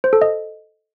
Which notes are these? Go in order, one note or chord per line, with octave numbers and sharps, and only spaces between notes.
C5
A4
D#5